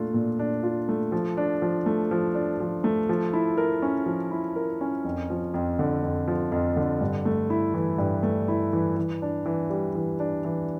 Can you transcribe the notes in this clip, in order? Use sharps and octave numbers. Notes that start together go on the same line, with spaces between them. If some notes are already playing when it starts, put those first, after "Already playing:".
Already playing: A#2 A3 D4 F4
A#2
D4
F4
A3
F3
D4
F3
A3
F3
D4
F3
A3
F3
E4
A#4
C#4
F3
E4
A#4
C#4
F2
F3
F2
D3
F2
F3
F2
D3
G2
A3
E4
E3
G2
A3
E4
E3
E3
D4
E3
G3
E3
D4
E3